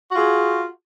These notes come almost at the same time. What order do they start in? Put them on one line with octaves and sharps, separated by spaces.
F#4 F4 G#4